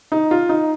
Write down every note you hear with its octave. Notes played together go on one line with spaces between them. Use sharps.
D#4
F4
D#4